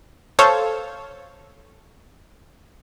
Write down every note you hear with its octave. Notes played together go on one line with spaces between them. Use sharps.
A4 C5 C#5 F5